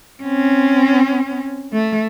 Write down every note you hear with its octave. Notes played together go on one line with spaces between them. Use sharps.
C4 C#4
A3